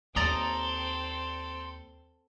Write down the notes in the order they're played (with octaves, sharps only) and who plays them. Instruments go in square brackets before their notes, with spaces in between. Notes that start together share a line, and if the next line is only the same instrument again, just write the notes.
[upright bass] D#2 [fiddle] C4 A4 [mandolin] D5 A#5 D#6 [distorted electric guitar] C6